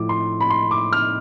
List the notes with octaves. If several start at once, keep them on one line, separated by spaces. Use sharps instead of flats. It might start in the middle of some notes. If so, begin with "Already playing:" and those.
Already playing: A2 F3 D6
C6
B5
C6
D6
F6